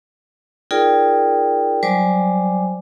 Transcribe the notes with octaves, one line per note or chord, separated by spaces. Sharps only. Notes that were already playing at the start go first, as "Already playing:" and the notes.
D#4 F4 G#4 A#4 D5 G5
F#3 G3 C5 D5 G#5 D6